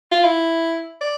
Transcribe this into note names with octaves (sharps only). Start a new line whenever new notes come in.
F4
E4
D5